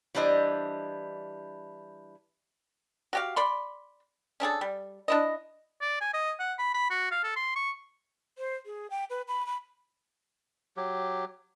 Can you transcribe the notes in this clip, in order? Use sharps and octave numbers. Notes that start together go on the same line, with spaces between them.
E3 G3 D4 E4 C5 D#5
F#4 G4 F5
D5 B5 C6
C#4 D4 G#4 A4
G3
D4 E4 D#5
D5
G#5
D#5
F#5
B5
B5
F#4
F5
A4
C6
C#6
C5
G#4
G5
B4
B5
B5
F#3 G4